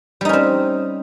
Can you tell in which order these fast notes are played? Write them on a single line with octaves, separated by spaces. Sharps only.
G3 D#4 C#4 C4